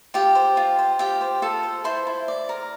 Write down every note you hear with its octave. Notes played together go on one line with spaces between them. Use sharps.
F4 G4 G5
C5
F4
C5
F4 G4 G5
C5
F4 A4 A5
C5
E4 C5 C6
E4
D5
A#4